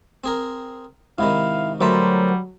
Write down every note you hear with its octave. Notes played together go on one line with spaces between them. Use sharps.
C4 G#4 A#4
G#2 C3 D#3 E4 F5
D2 F#3 G3 A#4 C5 E5 A5